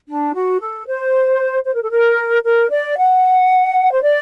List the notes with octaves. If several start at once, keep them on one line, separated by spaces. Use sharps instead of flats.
D4
F#4
A4
C5
C5
A#4
A4
A#4
A#4
D5
F#5
C5
D5